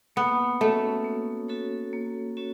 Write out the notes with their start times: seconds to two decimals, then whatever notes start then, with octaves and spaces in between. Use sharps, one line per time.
0.16 A#3 B3
0.61 A3 C#4 F#4 A4 C#5
1.04 A#3
1.48 C#4 F#4 A4 C#5
1.93 A#3
2.37 C#4 F#4 A4 C#5